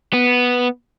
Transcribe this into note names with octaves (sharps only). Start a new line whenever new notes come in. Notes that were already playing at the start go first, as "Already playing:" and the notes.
B3